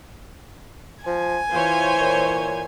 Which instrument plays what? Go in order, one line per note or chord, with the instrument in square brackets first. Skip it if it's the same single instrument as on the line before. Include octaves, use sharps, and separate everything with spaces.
[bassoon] F3 [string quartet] G#5
[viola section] E3 C5 C#5 [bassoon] F4
[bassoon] A#2